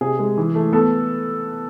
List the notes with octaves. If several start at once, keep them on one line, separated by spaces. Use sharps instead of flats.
C3 G#4
G#3
E3
A3
B3 A4